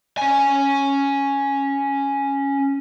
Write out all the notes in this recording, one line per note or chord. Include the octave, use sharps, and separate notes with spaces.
C#4 G#5